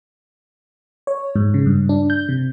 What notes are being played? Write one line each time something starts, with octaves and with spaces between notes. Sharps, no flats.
C#5
G#2
C#3
G2
D4
G6
C3